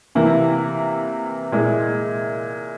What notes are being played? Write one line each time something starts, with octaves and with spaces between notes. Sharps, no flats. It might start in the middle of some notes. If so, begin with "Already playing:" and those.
C3 E3 A#3 E4
A#2 G#3 E4